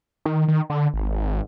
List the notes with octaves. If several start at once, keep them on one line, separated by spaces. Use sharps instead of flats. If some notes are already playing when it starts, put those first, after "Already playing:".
D#3
D#3
D3
G#1